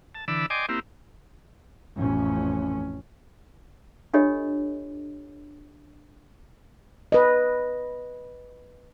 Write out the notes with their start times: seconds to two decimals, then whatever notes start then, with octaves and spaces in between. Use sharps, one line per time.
0.15 A5
0.28 D3 E3 D5 B5 E6
0.50 D5 D#5 G5 G#5 C6 D6
0.69 A#3 C4 E4 G4
1.97 A1 F2 C#4
4.13 D4 F4 G4 A4 C#5 D#5
7.12 B4 D#5